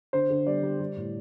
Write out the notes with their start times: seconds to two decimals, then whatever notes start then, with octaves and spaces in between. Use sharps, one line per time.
0.13 D3 C5
0.30 D3
0.46 G3 D5
0.63 G3
0.80 G3
0.97 A2